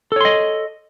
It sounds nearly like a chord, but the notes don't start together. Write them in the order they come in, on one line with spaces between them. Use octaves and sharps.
A4 C#5 C6 D#5